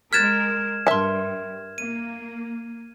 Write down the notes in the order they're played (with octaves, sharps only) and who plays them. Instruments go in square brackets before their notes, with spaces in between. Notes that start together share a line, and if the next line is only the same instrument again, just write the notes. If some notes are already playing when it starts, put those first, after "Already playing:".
[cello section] G#3 A#4 [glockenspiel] F6 G#6 E7 [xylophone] F#6 A6 B6
[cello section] G2 [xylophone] A#4 C6 [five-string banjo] E5 A5
[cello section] A#3 [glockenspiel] D#7